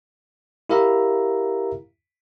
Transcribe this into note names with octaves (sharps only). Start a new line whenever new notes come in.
E4 G4 A#4 E5 F5 A#5